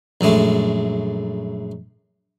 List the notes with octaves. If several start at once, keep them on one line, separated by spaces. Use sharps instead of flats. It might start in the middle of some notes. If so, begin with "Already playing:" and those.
A#1 F#2 G#3 A3